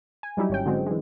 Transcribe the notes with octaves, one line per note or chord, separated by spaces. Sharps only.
G#5
F#3 G3 D#4 E4 G4
G#1 C#4 G5
D3 F#3 G#3 C4
E3 G#3